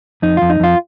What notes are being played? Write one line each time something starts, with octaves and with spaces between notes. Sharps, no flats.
F2 D#4
F2 F4
D#4
F2 F4